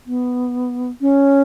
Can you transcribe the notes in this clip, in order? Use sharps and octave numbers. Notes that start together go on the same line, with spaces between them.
B3
C#4